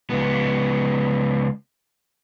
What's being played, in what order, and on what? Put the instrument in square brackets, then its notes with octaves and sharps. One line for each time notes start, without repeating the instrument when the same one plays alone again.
[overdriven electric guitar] C#2 B3